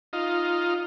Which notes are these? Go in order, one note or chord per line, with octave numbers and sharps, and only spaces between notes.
D#4 F4